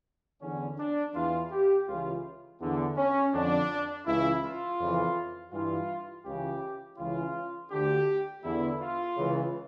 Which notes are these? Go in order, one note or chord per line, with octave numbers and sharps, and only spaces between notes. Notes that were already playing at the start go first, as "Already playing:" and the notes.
E2 D3 C#4
D4
E2 E3 F4
G4
C#2 C#3 E3 F4
E2 D3
C#4
F2 D3 D4
C#2 C#3 E3 E4
F4
F2 C#3 E3
G2 E3 F4
C#2 C#3 E3 G4
C#2 C#3 E3 F4
D2 D3 G4
E2 D3 E4
F4
C#2 C#3 E3